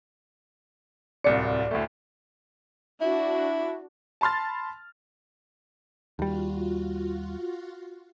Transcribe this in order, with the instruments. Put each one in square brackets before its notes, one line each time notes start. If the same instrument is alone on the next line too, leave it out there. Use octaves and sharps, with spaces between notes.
[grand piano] D1 C2 C#7 [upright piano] D5
[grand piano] D2 A2 A3
[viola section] D4 F#4 [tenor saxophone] E4
[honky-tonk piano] A5 B5 C6 F6 A6
[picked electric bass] D#2 G3 [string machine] F4 F#4